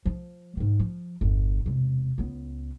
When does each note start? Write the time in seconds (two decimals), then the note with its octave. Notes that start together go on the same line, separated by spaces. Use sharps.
0.05 F3 F4
0.57 G#2 D#3
0.80 F3
1.21 G1 E2
1.66 E1 C3
2.18 C#2 B3